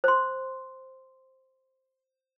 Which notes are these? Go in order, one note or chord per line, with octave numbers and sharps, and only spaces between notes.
C5 C6